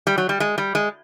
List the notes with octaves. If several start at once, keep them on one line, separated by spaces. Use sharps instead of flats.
G3
F#3
G3
G#3
G3
G#3